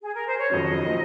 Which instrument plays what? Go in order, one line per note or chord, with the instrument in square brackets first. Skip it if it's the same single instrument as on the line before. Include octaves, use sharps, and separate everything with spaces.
[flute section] G#4
A#4
C5
C#5
[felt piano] F1 F2 D#3 F#3 C#4 [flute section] D#5
[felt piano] A#2 F#3 C4 D#4